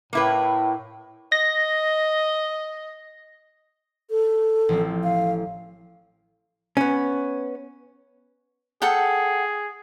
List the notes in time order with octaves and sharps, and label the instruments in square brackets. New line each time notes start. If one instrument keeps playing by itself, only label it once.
[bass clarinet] A2 [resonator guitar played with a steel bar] A#3 E4 B4
[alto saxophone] D#5 [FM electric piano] A#6
[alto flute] A4
[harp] A1 F3 C4
[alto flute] F5
[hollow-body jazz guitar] B3 C#4
[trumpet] G#4 [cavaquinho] A4 F#5 G5